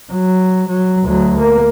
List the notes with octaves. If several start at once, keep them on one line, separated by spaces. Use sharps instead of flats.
F#3
F#3
D2 F#3
A#3